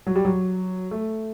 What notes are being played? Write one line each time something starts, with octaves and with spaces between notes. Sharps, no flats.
F#3
G3
F#3
A3